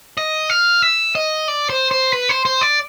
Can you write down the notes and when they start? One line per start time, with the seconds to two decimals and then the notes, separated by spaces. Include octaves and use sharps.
0.17 D#5
0.50 F5
0.82 E5
1.15 D#5
1.48 D5
1.70 C5
1.91 C5
2.13 B4
2.29 C5
2.45 C5
2.61 D5